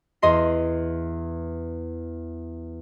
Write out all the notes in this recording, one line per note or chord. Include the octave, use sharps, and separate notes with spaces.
E2 D#5 C6 C7